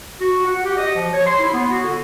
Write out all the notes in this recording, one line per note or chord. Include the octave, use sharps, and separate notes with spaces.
F#4
F#5
G4
D#5
F3
C#5
C6
E4
B3
F#4
D3